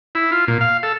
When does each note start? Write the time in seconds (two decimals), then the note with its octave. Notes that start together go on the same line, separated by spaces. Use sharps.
0.15 E4
0.32 F4
0.48 A#2
0.61 F5
0.83 A4